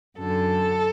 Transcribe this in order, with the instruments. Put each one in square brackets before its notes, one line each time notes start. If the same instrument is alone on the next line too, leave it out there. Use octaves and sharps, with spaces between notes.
[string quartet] F#2 D3 A4